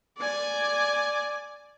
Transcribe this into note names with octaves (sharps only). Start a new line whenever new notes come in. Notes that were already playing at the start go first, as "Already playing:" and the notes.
D5 G#5